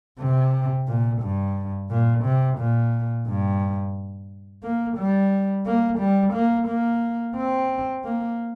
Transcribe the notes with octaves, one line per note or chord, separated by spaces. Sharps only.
C3
A#2
G2
A#2
C3
A#2
G2
A#3
G3
A#3
G3
A#3
A#3
C4
A#3